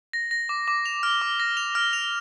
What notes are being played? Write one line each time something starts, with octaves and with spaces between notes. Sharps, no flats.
A#6
A#6
D6
D6
F7
F6
D6
A#6
F7
F6
F7